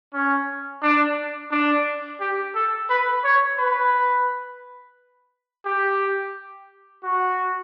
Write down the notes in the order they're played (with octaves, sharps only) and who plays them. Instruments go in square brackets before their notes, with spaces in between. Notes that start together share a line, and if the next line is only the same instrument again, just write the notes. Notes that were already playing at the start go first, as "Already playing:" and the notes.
[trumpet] C#4
D4
D4
G4
A4
B4
C#5
B4
G4
F#4